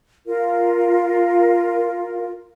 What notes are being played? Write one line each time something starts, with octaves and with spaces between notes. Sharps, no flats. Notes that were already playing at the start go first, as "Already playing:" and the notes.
F4 A#4